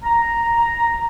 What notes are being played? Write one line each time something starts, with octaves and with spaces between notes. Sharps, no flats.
A#5